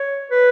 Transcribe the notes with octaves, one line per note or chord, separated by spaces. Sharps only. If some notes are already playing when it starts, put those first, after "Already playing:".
Already playing: C#5
B4